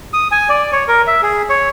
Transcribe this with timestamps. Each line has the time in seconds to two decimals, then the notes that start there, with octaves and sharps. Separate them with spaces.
0.13 D#6
0.31 G#5
0.49 D5
0.73 C#5
0.88 A#4
1.07 E5
1.22 G#4
1.49 C#5